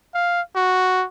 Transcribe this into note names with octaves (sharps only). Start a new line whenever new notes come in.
F5
F#4